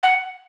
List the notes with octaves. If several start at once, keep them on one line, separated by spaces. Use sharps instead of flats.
F#5